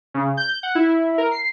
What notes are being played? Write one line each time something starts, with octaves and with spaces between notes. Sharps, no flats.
C#3
G6
F#5
E4
A#4
C7